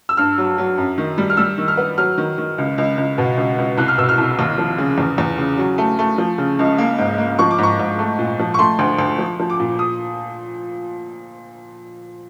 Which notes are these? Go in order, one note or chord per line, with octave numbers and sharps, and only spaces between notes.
E6
G2 F6
F#3
F#3
F#2
D#3
G3
F6
G3 E6
D#3
F6
B3
F#3 F6
D#3
D#3
C#2
C#2
C#2
B2
C#2
C#2
C2 F#6
F6
B2 E6
F6
C2
D#2
F3
C#3
E2
E2
C#3
F#3
A3
A3
F3
C#3
C#2
A#3
G#2
A#3
F3 C#6
D6
G#2 C#6
G#2
A3
A#2
F3
C#6
A3 C6
D2
D2
F3
F3
D6
A#2
D#6